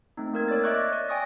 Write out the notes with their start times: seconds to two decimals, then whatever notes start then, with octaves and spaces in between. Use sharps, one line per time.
0.17 A3 C4 D#4
0.34 A#3 A#4 G#6
0.48 C#5 D5 E6 A6
0.64 D#5 E5 C#6 D6 F#6
0.92 D5
1.09 D5 G5 G#5 C#6 D#6 A#6